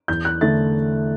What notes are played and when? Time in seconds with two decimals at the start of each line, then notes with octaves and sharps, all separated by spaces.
0.08 E2 G6
0.25 F#6
0.41 D3 A3 E4 A6